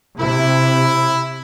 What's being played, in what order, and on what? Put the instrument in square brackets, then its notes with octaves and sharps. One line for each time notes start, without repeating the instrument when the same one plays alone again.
[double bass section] C3 [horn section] E4